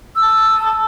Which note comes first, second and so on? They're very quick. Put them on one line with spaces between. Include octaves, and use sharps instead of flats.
E6 A5 D#6